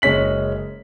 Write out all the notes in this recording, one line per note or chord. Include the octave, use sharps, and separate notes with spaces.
F#1 G#3 C#4 B6 F#7